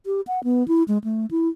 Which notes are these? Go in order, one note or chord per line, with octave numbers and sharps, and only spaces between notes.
G4
F#5
B3
E4
G#3
A3
E4